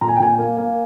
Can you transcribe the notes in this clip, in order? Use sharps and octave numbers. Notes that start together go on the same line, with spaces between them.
A#2 A#5
G#5
G5
A#2 G#5
A#3
A#3